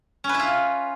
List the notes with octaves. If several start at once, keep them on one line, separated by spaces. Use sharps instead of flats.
C#4
B4
E4
F4